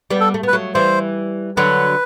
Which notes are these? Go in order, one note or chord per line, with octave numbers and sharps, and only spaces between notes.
G3 B3
A4
A3
B3 B4
F#3 A3
E3 G3 C5
D3 F#3 B4